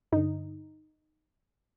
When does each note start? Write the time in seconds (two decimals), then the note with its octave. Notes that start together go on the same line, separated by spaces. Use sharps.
0.12 G2 D3 D#4